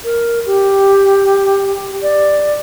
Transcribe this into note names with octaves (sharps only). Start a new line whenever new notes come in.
A#4
G4
D5